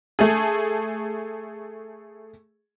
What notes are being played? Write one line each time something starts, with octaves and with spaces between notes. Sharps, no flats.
A3 G#4